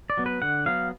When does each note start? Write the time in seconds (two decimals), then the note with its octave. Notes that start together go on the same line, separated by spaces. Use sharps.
0.10 D5
0.17 F#3 B3
0.26 B4
0.42 D3 F#5
0.66 F#3 B3 F5